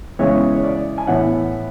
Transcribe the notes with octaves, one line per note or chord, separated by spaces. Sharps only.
C#3 E3 G#3 B3 C#5
C#5
D5
G#5
A2 E3 B3 F#5